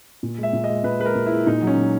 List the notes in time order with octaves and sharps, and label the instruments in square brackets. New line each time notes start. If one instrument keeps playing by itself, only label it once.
[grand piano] A#2
G#3 E5
A#2
D#5
G#3
A#2 B4
G#3 B4
A#4
A#2
G#3 E4
A#2 D#4
F#3 C#4
A#2